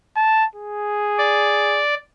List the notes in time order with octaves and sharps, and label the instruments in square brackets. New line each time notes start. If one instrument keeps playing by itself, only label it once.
[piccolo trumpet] A5
G#4
[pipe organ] D5